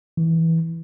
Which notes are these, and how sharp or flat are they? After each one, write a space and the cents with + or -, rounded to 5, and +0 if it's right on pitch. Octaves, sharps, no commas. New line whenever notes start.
E3 -15